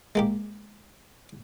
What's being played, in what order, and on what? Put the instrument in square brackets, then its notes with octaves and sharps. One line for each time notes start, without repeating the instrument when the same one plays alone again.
[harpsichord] G#3 A#3 G4